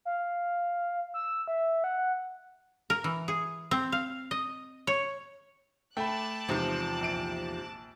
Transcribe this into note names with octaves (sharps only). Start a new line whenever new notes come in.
F5
E6
E5
F#5
A#4
E3
G#4
C4
F5
D#5
C#5
A3 G5 A5 B5 D6 F#6
E2 G#2 C3 F3
A#1 D7